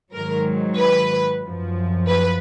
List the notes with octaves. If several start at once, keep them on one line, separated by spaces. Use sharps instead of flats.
G#2 D#3 F#3 A#4
B4
F#2 F3
B4